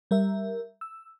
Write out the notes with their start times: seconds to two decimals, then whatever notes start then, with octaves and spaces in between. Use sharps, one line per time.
0.11 G3 A#4 E5
0.81 E6